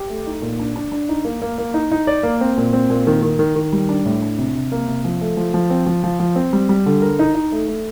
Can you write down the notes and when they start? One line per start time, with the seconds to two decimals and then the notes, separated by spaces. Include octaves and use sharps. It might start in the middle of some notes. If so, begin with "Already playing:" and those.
Already playing: G4
0.10 A3
0.27 D#4
0.42 A#2
0.60 D4
0.76 D4
0.92 D4
1.09 D#4
1.25 A#3
1.42 A#3
1.58 A#3
1.74 D#4
1.91 D#4
2.07 D5
2.23 A#3
2.41 C4
2.57 A#2
2.73 C4
2.90 A#2
3.07 D#3
3.23 D#3
3.39 D#3
3.56 D#3
3.73 G3
3.89 D4
4.05 A2
4.22 D4
4.38 C3
4.55 C3
4.72 A#3
4.88 C3
5.05 F3
5.21 A3
5.37 F3
5.54 F3
5.70 C4
5.87 F3
6.04 F3
6.20 F3
6.36 C4
6.53 G3
6.69 G3
6.86 D3
7.02 A#4
7.19 D#4
7.35 D#4
7.52 A3
7.68 A3